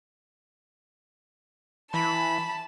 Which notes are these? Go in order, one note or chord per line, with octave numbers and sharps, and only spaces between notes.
E3 A5 B5